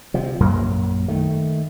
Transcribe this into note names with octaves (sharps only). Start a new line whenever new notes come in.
C3 F3
A#1 F#2 F#3 A#3
D#3 A3